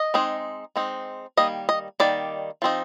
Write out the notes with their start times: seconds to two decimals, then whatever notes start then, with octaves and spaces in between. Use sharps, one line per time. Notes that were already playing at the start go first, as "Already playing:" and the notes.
Already playing: D#5
0.14 G#3 C4 D#4
0.76 G#3 C4 D#4
1.37 D#3 G3 A#3 D#5
1.69 D#5
2.00 D#3 G3 A#3 D5
2.62 F3 C4 D#4